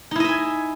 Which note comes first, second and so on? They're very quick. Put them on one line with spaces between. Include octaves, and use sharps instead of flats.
D#4 E4 D#5 E5 G#5